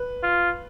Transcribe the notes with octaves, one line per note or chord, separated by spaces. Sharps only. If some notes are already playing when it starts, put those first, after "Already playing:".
Already playing: B4
F4